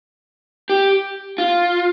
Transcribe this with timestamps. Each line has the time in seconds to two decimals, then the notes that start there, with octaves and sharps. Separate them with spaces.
0.70 G4
1.38 F4